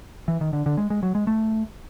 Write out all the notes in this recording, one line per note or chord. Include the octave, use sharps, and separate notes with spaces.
E3
D#3
D3
D3
G#3
G#3
F#3
G#3
A3